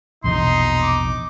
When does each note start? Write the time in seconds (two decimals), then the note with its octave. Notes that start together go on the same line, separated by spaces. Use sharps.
0.24 A#1 E2 B2 D#4 C6
0.82 D6